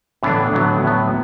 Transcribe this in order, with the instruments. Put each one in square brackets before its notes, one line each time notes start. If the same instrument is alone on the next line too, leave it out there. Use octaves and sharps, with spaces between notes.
[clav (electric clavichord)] A2 E3 B3 D4 [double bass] D3
[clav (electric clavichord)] A2 F#3 B3
A2 F#3 B3